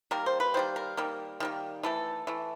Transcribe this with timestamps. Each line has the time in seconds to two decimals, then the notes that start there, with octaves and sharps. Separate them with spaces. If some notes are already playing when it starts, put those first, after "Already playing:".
0.11 D#3 G3 A#3 A#4
0.26 C5
0.40 B4
0.54 D#3 G3 A#3 C5
0.76 A#4
0.97 D#3 G3 A#3
1.40 D#3 G3 A#3
1.83 E3 A3 A4
2.27 E3 A3